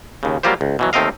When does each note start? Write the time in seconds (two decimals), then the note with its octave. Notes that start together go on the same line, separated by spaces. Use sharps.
0.23 D#2 C#3
0.43 F#3 G3 A#3 F4 G4 C5
0.61 C#2
0.79 B2 E3 F#3
0.93 D#2 A3 C4 A#4 D#5 F5